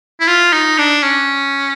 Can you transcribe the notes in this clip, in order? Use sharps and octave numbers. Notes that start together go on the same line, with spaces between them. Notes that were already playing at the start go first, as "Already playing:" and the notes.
E4
F4
D#4
D4
C#4